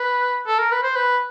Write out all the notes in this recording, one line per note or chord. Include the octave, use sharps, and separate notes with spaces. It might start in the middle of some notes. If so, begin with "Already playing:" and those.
Already playing: B4
A4
A#4
B4
C5
B4